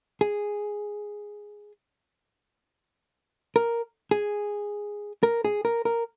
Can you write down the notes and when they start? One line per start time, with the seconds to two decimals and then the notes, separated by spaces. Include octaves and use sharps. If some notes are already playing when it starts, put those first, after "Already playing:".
0.21 G#4
3.56 A#4
4.11 G#4
5.23 A#4
5.45 G#4
5.65 A#4
5.85 A#4